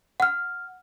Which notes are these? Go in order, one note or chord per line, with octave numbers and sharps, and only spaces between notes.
F#5 F6